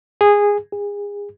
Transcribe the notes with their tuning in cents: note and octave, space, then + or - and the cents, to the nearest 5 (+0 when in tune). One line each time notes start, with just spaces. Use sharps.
G#4 -15
G#4 -30